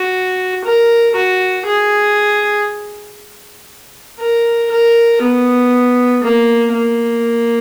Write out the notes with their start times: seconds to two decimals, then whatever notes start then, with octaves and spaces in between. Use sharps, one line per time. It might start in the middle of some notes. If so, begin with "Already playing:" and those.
Already playing: F#4
0.64 A#4
1.15 F#4
1.66 G#4
4.20 A#4
4.71 A#4
5.22 B3
6.23 A#3
6.73 A#3